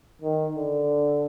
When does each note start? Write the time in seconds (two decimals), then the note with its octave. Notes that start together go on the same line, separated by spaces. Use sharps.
0.22 D#3
0.55 D3